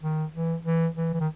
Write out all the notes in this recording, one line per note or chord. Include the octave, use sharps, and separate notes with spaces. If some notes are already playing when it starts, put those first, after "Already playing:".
D#3
E3
E3
E3
E3
D#3